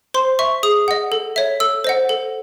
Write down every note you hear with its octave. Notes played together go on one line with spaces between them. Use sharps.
C5 C6
E5 C#6
G#4 D#6
D#5 F#5
A4
C#5 E5
A4 E6
C5 D#5 F#5
A4